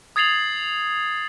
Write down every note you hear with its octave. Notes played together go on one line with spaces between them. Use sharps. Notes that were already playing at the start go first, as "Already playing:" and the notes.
D#6 G#6 A6 C7 F7 F#7